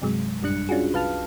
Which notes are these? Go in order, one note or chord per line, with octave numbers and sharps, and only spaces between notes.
G2 C3 F#3 G#3
A1 F#2 G3 D4 F#6 C#7
C#4 D4 F4 F#4 G#4
C2 B4 F5 A5 F6